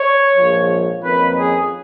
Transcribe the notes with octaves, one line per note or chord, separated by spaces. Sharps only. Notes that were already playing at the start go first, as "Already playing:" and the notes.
Already playing: C#5
A#1 G#2 F3
F2 D#3 A#3 C#4 B4
G#4